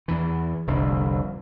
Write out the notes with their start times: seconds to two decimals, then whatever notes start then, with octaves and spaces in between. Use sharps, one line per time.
0.08 E2 E3
0.67 F1 C2 D3